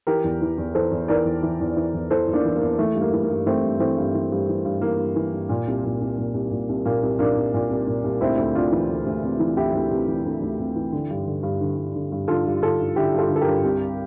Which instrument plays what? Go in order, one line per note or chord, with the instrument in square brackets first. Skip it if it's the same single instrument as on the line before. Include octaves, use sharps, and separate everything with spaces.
[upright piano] E3 G4 A#4
E2
E3
E2
E3 A4 C5
E2
E3 A#4 D5
E2
E3
E2
E3
E2
E3 A4 C5
E2
A#3 D4
E3
A#3
E2
E3 A3
G2
A#3
E3
A#3
G2
E3 A3 C4
G2
E3 A3 C4
G2
E3
G2
E3
G2
E3 A#3
G2
E3
G2
A#2
C2
A#2
C2
A#2
C2
A#2
C2
A#2 A#3
C2
A#2 A#3 D4
C2
A#2
C2
A#2
C2
D2 C4 E4
D2
C3 D4 F4
E3
D2
D2
C3
E3
D2 E4 G4
D2
C3
E3
D2
D2
C3
E3
D3
G2
D3
G2
D3
G2
D3
G2
D3 F4 A4
G2
D3 F4 A4
G2
D3 E4 G4
G2
F4 A4
D3
A4
G4 A#4
G2
C2